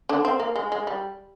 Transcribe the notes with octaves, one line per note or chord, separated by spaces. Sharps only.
D3 D4
C4
A#3
G#3
G#3
G3